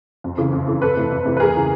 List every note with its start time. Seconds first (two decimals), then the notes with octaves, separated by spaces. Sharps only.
0.24 F2
0.38 C#3 E3
0.53 F2
0.68 C#3 E3
0.82 F2 A4 B4
0.97 C3 E3
1.11 F2
1.26 C3 E3
1.37 B4
1.40 E2 G#4 A#4
1.55 C#3 E3